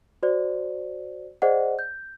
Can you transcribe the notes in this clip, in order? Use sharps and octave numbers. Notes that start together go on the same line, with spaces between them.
F#4 C5 D5
G#4 C5 D5 D#5 F#5
G6